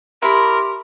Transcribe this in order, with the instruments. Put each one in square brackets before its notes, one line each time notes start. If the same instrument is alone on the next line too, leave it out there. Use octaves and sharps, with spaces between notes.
[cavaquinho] E4 B5 [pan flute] G4 [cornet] A#4 [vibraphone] C6